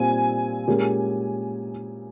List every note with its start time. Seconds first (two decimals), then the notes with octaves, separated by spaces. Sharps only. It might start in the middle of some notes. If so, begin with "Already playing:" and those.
Already playing: A#2 G3 C4 F4 G#5
0.68 A#2 G#3 C#4 G4 A#4